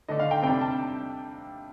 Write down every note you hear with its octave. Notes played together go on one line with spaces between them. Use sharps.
D3 A3 D4 D#5
F5
G5
C3 G3 D4 G5
A5